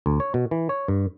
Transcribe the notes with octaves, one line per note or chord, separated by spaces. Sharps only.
D2
C#5
B2
E3
C#5
G2